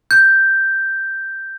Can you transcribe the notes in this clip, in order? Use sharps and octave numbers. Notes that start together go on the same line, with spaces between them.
G6